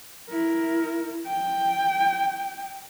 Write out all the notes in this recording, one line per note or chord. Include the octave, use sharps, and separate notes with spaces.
E4 A#4
G5